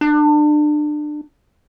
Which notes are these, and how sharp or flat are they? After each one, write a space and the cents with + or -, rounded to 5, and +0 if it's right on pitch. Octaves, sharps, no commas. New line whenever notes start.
D4 +30